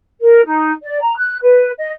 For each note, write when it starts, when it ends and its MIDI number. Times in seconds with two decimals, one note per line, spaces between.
0.21 0.40 70
0.45 0.72 63
0.82 0.98 74
1.01 1.14 82
1.16 1.37 90
1.42 1.70 71
1.78 1.91 75